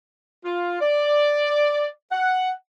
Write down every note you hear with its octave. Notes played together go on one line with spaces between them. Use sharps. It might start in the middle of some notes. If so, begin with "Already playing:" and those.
F4
D5
F#5